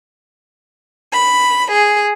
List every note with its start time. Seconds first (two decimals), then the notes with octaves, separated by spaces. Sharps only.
1.11 B5
1.72 G#4